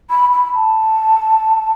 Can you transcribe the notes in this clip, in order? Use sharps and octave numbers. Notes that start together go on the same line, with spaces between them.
B5
B5
A5